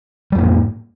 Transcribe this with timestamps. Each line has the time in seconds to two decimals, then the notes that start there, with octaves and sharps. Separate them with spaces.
0.32 G3
0.35 F2
0.38 A#3
0.41 A2